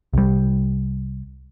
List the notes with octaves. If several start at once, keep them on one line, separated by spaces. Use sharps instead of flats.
C2 G3